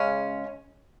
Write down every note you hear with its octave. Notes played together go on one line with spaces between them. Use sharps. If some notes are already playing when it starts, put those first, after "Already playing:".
Already playing: C#3 G#3 C#4